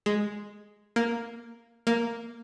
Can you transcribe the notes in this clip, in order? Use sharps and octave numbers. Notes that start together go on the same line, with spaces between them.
G#3
A#3
A#3